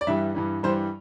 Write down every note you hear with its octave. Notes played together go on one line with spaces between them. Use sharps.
D5
G2 E3 G3 E5
G2 E3 G3
G2 E3 G3 C5